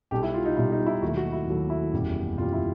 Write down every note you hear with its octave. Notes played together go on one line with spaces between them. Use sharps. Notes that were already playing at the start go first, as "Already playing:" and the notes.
B1 B2 G3 G4
E4
F4
D#4
B1 B2 G3 E4
D#4
E4
D#2 D#3 F#3 A3 F#4
F#4
E4
D#2 D#3 F#3 A3
E4
F#1 E2 B2 G3
F#1 E2 B2 G3 F4
E4